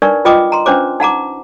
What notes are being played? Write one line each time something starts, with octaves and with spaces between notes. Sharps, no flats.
D4 D#4 A#4 B4 D5 C#6
F4 B4 D#5 G5 D6 D#6
A#5 C6
C#4 D4 B4 C5 D6
D#4 F#5 A#5 D6